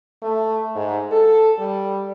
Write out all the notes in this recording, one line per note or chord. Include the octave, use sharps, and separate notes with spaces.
A3
G#2
A4
G3